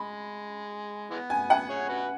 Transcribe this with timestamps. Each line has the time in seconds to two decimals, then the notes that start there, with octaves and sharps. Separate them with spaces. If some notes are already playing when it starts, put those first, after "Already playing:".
Already playing: G#3 B5
1.11 E3 G#3 B3
1.30 G#5
1.50 F#5
1.70 G#4 C#5
1.89 F#4 B4